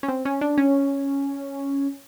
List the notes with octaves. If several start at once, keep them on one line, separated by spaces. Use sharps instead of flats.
C#4
C4
C#4
D4
C#4